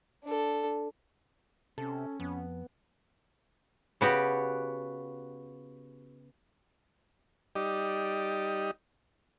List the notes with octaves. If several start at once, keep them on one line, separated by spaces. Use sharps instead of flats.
D4 A4
C3 C#4 A4
F2 B3
C#3 B3 F#4 G4
G3 D#4 G4 D5 D#5